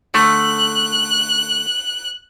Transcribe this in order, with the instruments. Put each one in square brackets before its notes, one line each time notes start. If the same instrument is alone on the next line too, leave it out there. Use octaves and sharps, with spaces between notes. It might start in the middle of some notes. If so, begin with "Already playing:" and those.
[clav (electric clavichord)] D3 A3 [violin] F#6